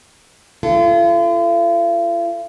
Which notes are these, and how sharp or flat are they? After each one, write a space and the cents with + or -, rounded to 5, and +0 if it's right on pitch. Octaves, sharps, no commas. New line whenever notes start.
F4 -45 A4 +0